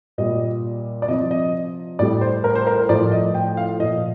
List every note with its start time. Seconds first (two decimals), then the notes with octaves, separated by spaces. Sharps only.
0.18 A#2 G3 D#5
1.02 D5
1.08 C3 F3 D#5
1.31 D#5
1.99 A2 G3 D5
2.21 C5
2.44 A#4
2.55 C5
2.67 A#4
2.78 A#4
2.89 A2 F3 D5
3.12 D#5
3.34 G5
3.57 F5
3.80 A#2 F3 D#5